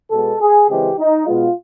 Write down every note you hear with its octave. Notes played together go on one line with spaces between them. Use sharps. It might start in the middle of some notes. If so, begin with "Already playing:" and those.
B2 G#3 B3 A4
G#4
C#3 E3 G#3 C4 G4
D#4
B2 G#3 B3 F4